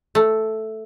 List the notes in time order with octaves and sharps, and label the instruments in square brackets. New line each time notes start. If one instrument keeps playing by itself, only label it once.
[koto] A3